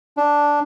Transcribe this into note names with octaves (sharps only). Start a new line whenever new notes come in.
D4